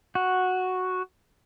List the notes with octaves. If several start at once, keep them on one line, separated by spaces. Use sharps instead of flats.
F#4